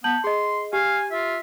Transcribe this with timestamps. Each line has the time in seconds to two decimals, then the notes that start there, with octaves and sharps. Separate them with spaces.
0.04 B3 A5 G6 F#7
0.24 G#4 D#5 C6
0.73 G4 F5 G#5
1.11 F4 E5